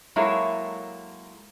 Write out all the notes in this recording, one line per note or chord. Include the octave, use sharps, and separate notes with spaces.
F#3 G#3 A#3 E4 A4 C#5